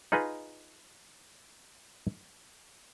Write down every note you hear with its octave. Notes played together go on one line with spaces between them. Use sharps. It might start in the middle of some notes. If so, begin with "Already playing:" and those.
D#4 F4 G#4 B4 D#5